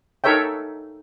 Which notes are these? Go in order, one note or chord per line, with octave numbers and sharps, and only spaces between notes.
D#4 A4 A#4 C#5 E5 G5